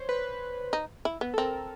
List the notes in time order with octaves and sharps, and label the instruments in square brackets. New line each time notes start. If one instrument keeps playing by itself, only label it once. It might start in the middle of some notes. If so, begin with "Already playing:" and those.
Already playing: [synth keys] C5 C#5
B4
[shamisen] D#4
E4
B3
[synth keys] A4
[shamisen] C4 [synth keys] A#4